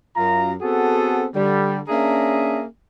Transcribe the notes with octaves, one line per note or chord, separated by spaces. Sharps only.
F#2 F4 A#5
B3 C4 F#4 G#4 A4
D3 G3
A#3 C#4 D4 G#4 E5 A#5